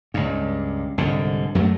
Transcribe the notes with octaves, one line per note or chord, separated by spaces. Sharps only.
C#2 G2
C2 G#2 D3
F#2 F#3 A3